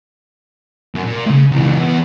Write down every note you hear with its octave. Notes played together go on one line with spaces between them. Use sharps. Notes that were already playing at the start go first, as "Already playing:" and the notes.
F#2
A#2
A2 C#3
C#2 E3
E2 B3